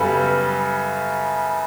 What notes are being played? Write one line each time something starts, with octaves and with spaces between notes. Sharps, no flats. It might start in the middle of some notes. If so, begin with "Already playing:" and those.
Already playing: F#2 C#3 G3 B3 A4